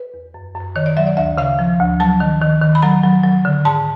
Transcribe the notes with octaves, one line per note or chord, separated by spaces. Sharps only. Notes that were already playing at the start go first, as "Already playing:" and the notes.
Already playing: B4
E2
F#2
F#2
D#3 C#5
D5
F#3 E5
D5
D2 E5
C#3 F5
F3
D2
F#3 A5
D#3
D#3
D#3
B5
F#3 A#5
F#3
F#3
D3
G#2 A5